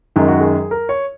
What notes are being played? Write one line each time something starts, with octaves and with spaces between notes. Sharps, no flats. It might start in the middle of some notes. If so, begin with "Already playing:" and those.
F#2 D#3 G#3 G#4
F#4
G#4
A#4
C#5